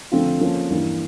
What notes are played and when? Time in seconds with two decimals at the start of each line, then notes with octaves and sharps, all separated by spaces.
0.12 D3 F3 A3 C4 F4
0.41 F3 A#3 C#4 F4 A4
0.71 G2 E3 G3 A#3